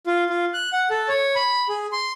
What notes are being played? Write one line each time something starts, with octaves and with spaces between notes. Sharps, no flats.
F4
F4
F#6
F#5
A4
C#5
B5
G#4
C6